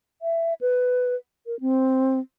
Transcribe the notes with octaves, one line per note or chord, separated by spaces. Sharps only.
E5
B4
A#4
C4